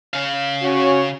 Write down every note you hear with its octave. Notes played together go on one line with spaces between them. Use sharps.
C#3 F5
C#4 F#4 C#5